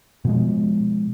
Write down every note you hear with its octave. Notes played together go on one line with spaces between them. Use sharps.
B2 F3 G#3